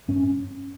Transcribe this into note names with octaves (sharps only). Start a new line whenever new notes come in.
G2 C#4